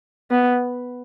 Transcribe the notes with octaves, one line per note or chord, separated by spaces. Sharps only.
B3